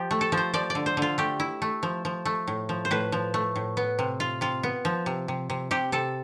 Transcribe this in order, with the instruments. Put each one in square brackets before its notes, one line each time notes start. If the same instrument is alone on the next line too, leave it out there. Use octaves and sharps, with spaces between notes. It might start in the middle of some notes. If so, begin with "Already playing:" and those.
Already playing: [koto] F3 G4
A3
A4
F3
C5
F3 D5
D5
D3
C5
D3 F4
A3 G4
E4
A3
F3
F3
A3
A2
F3
C5
A2 B4
F3
A3
A2
B3
C3
F4
C3 F4
B3
F3
C3
C3
C3
C3 G4
C3 A4